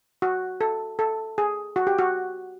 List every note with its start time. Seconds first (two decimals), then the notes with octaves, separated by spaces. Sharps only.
0.22 F#4
0.61 A4
0.99 A4
1.38 G#4
1.76 F#4
1.87 G4
1.99 F#4